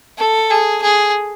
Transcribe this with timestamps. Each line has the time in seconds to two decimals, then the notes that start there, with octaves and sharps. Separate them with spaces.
0.18 A4
0.51 G#4
0.82 G#4